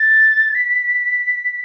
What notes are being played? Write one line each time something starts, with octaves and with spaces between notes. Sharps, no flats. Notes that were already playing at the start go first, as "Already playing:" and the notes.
Already playing: A6
B6